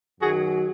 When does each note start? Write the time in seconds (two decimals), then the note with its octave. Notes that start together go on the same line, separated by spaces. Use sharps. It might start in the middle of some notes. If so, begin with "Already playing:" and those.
0.20 F#2 D#3 F#3 F#4 G#4